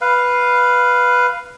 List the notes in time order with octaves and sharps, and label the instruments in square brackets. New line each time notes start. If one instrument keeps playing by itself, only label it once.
[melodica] B4 F5